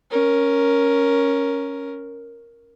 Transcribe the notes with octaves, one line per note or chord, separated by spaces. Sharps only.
C#4 A#4